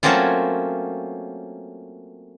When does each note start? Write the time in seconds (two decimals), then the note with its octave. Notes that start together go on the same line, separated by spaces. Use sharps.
0.03 F#3 A3 A#3 C4 C#4 F4